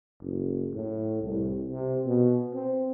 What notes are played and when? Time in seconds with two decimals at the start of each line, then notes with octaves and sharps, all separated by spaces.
0.22 F#1
0.74 A2
1.23 C2
1.68 C3
2.06 B2
2.54 C4